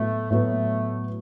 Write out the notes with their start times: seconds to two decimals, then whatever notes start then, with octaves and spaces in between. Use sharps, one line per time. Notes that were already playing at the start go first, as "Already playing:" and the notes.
Already playing: A2 F#3 A3 B3
0.30 A2 F#3 A3 B3